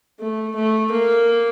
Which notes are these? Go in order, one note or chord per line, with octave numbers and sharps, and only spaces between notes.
A3
A3
A#3